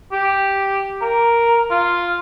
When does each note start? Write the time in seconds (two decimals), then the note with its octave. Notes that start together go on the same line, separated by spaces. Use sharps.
0.12 G4
1.02 A#4
1.71 F4